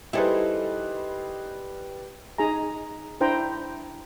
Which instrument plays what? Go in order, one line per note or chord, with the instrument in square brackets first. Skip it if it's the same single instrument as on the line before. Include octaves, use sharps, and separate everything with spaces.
[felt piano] G3 B4 [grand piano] D#4 G#4 C5 [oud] E4 A4
[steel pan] D#4 G#4 G#5 A#5
D4 E4 C5 G5 A#5